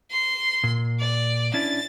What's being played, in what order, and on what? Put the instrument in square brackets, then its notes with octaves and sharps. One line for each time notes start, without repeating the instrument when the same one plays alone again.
[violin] C6
[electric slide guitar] A#2
[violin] D5
[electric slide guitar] C#4 D4 E4 [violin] A6